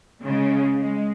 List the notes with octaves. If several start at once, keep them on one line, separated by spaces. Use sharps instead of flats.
C#3 G#3
G#3